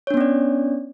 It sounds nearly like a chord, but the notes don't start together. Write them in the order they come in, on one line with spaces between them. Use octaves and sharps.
C#5 D4 B3 C#4 D5